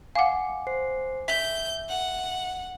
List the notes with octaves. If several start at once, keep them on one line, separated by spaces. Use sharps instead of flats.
F5 F#5 G#5 D6
C5 C7
E5 G6 B6
F#5